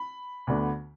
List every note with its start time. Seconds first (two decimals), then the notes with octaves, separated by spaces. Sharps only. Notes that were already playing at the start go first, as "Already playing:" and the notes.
Already playing: B5
0.47 D2 D3 B3 D4